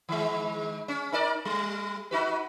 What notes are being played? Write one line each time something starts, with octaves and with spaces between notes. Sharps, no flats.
D#3 G#3
C#4
D#4 A#4 D5
G3
D#4 F#4 B4